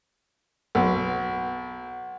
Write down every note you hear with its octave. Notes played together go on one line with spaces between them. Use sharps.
B1